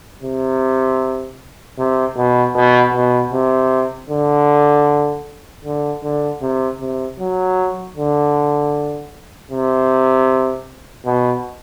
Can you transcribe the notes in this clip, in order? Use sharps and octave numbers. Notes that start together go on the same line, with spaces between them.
C3
C3
B2
B2
B2
C3
D3
D3
D3
C3
C3
F#3
D3
C3
B2